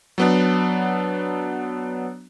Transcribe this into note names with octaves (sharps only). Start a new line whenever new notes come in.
F#3 B3 D4